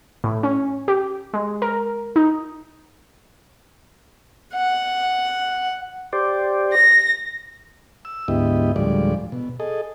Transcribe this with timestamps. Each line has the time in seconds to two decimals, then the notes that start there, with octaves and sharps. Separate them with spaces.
0.24 A2
0.43 C#4
0.88 G4
1.34 G#3
1.62 A#4
2.16 D#4
4.55 F#5
6.13 G4 C5 D5
6.73 A#6
8.05 E6
8.28 D2 G#2 B3 E4 G4 D#5
8.76 D2 A2 F3 G3 G#3 D5
9.32 B2
9.60 G#4 A4 D#5